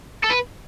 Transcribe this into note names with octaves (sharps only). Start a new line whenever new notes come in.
A4
B4